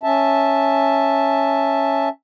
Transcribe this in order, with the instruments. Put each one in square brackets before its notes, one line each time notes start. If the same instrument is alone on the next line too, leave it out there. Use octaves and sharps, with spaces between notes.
[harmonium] C#4 E5 A5